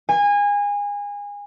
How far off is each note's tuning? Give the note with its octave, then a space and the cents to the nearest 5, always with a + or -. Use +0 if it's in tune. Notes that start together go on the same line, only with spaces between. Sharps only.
G#5 -25